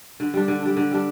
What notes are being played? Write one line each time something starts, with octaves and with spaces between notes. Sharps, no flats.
D3
G3 D4
D3
G3 D4
D3
G3 D4